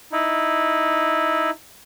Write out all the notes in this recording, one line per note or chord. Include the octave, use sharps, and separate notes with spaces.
D#4 E4